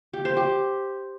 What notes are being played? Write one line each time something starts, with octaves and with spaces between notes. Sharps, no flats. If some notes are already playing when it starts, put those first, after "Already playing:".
G4
C5
G4